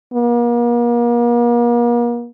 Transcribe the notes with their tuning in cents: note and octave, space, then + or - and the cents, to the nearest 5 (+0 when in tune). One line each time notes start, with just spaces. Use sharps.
A#3 +40